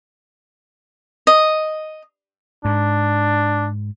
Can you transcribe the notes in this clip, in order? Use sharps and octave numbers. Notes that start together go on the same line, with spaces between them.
D#5
G#2 D4